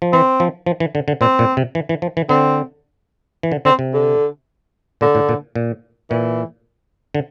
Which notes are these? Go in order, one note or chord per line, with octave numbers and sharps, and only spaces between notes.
F3
E3 C4
F3
F3
E3
D3
D3
A#2 C4
A#2
C3
E3
E3
F3
E3
D3 C4
E3
D3
D3 C4
C3
D3
A#2 D3
A2
A#2
A#2
A#2 E3
D3